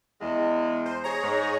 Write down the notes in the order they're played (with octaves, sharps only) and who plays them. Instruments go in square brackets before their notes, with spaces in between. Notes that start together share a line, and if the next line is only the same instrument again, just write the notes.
[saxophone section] E2 G#3
[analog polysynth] C5
G#4 C#5 A#5
[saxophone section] G#2